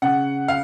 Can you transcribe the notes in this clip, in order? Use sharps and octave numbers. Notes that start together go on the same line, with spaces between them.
C#3 F#5
F5